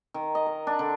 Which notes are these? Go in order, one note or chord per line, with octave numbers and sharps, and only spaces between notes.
D#3
D#5
A#4
D4
D3